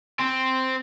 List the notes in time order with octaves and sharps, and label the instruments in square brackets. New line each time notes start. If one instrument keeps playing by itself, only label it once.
[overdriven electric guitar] C4